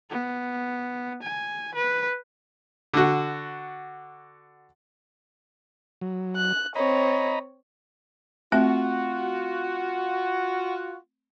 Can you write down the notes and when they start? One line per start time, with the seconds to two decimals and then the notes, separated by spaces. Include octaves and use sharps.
0.10 B3
1.23 G#5
1.75 B4
2.94 D3 F#4
6.01 F#3
6.36 F#6
6.75 C4 C#5 D#5 A#5 B5
8.52 A3 C4 F4 F#4 E5